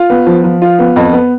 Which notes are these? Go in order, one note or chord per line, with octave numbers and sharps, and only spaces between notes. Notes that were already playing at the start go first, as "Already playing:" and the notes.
Already playing: F4
B3
F3
F3
F4
B3
F2
B3